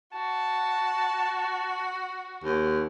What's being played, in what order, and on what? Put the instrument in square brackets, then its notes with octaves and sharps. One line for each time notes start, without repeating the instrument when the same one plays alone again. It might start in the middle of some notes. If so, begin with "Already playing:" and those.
[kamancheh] F#4 [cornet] A5
[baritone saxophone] D#2